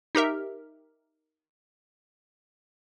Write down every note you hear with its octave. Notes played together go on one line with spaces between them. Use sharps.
D#4 G4 A#4 E5